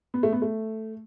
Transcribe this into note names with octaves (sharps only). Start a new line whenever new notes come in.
B3
A3
B3
A3